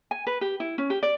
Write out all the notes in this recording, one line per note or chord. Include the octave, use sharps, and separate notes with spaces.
G#5
B4
G4
E4
C#4
G4
D5